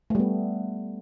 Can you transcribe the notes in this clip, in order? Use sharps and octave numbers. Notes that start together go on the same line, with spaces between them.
G3 A3 B3